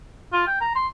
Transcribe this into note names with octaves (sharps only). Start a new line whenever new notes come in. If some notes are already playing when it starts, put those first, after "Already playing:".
F4
G5
A#5
C6